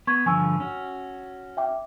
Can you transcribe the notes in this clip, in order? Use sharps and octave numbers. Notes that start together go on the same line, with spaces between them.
B3 C#6 G#6
G2 D3 F3 G#5 C#6 E6
C#4 F#4
E5 G5 D6